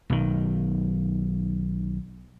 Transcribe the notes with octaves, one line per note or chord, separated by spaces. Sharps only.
B1 D#3